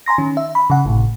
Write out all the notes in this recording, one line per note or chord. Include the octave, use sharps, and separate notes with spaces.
G#5 A#5 C6 A#6
D#3 C#4
E5
B5
C#3 F#5
G#1 A2 C3